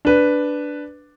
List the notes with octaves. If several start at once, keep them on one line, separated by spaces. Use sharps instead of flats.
D4 B4